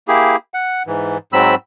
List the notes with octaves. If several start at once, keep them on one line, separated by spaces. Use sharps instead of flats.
A#3 E4 G4 G#4
F#5
G#2 E3
G#2 F#3 C4 B5 E6